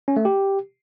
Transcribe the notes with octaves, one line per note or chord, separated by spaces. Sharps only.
C#4
A3
G4